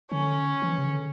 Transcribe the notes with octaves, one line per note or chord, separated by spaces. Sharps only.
D3 C#4
E3
C#3
D3